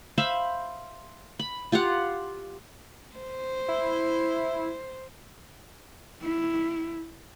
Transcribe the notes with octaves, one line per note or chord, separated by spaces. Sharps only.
C5 E5 F5 B5
B5
F4 G4 F5 F#5
C5
E4
E4